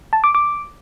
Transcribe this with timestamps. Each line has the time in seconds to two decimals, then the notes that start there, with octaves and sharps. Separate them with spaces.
0.13 A5
0.24 D6
0.35 D6